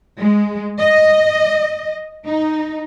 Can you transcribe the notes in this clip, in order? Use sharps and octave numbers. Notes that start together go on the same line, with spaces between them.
G#3
D#5
D#4